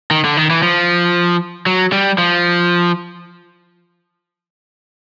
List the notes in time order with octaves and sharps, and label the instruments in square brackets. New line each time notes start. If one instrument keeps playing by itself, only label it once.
[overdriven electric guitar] D#3
D3
D#3
E3
F3
F#3
G3
F3